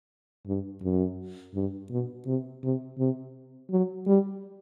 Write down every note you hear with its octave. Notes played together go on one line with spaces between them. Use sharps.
G2
F#2
G2
B2
C3
C3
C3
F#3
G3